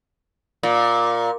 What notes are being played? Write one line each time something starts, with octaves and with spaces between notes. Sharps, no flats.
A#2